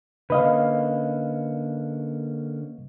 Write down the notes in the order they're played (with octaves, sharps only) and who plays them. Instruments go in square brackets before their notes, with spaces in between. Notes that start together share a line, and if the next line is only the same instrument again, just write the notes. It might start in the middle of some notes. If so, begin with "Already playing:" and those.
[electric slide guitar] D3 A#3 C#4 [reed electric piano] B4 D#5 F5